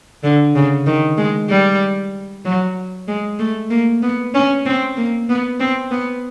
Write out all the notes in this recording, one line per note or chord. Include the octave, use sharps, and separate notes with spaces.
D3
C#3
D#3
G#3
G3
F#3
G#3
A3
A#3
B3
C#4
C4
A#3
B3
C4
B3